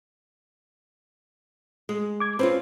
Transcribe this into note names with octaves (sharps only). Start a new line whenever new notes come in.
G#3
D6 G#6
C4 C#4 F4 B4 C5